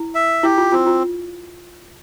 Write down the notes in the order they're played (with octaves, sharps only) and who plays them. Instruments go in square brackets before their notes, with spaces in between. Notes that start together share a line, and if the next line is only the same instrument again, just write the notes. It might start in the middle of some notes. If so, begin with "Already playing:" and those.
Already playing: [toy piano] E4
[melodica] E5
[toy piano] E4 [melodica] G4
[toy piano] F4
[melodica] C4 [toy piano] F4
[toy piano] F4